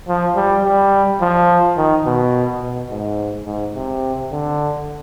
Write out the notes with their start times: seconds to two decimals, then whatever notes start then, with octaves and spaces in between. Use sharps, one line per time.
0.08 F3
0.36 G3
0.64 G3
1.21 F3
1.77 D#3
2.06 B2
2.62 B2
2.90 G#2
3.46 G#2
3.75 C3
4.32 D3